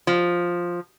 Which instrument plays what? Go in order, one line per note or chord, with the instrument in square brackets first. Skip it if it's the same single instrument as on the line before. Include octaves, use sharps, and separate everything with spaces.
[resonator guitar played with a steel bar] F3